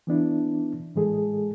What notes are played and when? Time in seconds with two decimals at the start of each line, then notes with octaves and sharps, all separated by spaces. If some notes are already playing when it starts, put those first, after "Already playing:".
0.07 E3 B3 D4 E4
0.95 A2 E3 G#3 G#4 A4